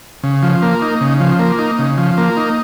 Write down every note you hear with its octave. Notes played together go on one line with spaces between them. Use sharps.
C#3
F3
A#3
D#4
C#3
F3
A#3
D#4
C#3
F3
A#3
D#4